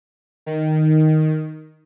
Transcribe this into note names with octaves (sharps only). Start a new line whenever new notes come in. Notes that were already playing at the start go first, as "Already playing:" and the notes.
D#3